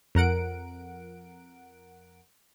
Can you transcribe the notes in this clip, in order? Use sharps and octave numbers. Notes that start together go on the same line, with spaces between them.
F2 A#4 F#5 D7